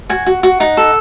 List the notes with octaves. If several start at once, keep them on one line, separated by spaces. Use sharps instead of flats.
F#4 G#5
F#4
F#4
D#4 F#5
A4